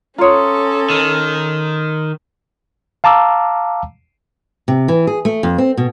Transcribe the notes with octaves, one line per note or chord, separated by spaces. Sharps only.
C#4 F4 A4 C#5 A#5 C6 D#6
D#3
F5 A5 A#5 D6 E6
C3
E3
G#4
A3
F2
C4
B2